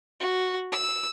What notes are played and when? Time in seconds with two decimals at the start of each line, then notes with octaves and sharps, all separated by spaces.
0.20 F#4
0.72 E6